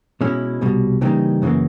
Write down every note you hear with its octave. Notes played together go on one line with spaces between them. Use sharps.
B2 G#3 C#4 E4
C2 B2 G3
C#3 E3 G3 A#3 D#4
F#2 C#3 E3 G3 A#3